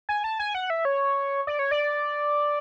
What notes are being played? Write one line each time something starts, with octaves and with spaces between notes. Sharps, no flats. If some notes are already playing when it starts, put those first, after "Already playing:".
G#5
A5
G#5
F#5
E5
C#5
D5
C#5
D5